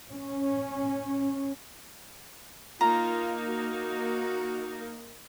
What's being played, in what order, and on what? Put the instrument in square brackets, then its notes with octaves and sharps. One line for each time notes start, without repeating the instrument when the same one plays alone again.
[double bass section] C#4
[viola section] A#3 D#4 A#4 [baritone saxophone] F4 [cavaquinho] A#5
[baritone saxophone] F#4